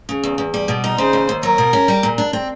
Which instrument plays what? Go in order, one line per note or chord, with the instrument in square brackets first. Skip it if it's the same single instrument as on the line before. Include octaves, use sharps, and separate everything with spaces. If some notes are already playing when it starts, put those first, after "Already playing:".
[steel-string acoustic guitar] C#3
E2
E2
G3
B2
D#4
[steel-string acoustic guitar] C#3 [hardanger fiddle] C5
[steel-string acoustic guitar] D#2
D#2
[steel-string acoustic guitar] F#3 [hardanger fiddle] A#4
[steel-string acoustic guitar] B2
C#4
G3
A#2
D4
C4